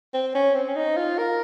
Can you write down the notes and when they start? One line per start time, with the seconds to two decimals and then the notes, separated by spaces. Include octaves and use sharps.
0.14 C4
0.35 C#4
0.55 C4
0.69 C#4
0.76 D#4
0.97 F4
1.18 A#4